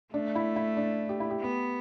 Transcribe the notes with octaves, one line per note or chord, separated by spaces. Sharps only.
A3 D4
E4
E4
D4
G4
E4
G4
B3